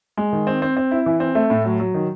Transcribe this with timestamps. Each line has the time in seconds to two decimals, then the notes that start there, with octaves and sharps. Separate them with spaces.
0.17 G#3
0.33 D#3
0.47 C4
0.62 C4
0.77 C4
0.91 E4
1.06 E3
1.20 C4
1.35 A3
1.50 A2
1.65 F#3
1.80 F#3
1.94 D#3